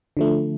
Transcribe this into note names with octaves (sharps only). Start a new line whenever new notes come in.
D3 F3 A3